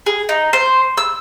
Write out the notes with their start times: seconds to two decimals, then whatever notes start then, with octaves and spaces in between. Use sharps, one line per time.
0.06 G#4
0.29 D#4
0.53 C5
0.97 E6